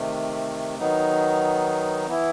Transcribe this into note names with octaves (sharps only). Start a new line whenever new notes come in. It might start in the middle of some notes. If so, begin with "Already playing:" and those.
Already playing: C3 D#3 A3
D#3 F#3 B3 D#4
E3 B3 E4